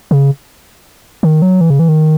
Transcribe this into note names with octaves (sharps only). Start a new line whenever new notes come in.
C#3
D#3
F#3
E3
C#3
E3
D#3